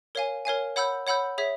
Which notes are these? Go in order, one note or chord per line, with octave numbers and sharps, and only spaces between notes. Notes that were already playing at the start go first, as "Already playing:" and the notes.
A#4 C#5 F5 G#5
A#4 C#5 F5 G#5
C#5 F#5 B5 E6 G6
C#5 F#5 B5 E6 G6
G#4 C#5 E5